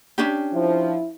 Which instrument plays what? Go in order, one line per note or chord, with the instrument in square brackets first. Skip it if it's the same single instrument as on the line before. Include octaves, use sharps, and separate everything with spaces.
[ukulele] C#4 D4 G4
[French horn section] F3 [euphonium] E4